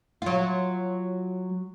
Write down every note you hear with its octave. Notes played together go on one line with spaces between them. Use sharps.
F#3 F4